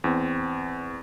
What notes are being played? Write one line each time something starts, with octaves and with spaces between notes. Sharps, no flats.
E2 C4